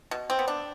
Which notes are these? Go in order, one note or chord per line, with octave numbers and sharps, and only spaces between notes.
B2
C4
B3
D4